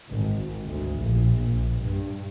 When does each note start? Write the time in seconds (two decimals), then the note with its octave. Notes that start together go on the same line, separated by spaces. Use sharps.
0.11 G#1
0.63 D2
1.00 A#1
1.35 A#1
1.79 G2